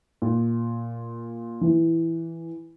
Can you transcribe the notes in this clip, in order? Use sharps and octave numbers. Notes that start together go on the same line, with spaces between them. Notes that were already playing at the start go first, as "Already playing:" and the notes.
A#2
E3